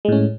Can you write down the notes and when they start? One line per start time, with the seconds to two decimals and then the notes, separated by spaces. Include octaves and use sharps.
0.05 G#3
0.09 A2
0.12 C#4